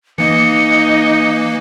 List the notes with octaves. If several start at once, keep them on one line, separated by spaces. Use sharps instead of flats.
E3 A#3 D#4 D#5 C#7